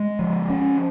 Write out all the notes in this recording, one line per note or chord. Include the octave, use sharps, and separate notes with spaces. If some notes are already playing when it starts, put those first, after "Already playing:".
Already playing: G#3
F3
C#4